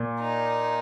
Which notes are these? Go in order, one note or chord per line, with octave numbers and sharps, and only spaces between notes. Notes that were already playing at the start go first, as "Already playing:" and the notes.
Already playing: A#2
D#4